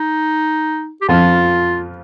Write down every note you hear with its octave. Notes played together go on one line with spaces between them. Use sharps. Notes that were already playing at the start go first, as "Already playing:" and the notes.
Already playing: D#4
G4
F2 F3 F4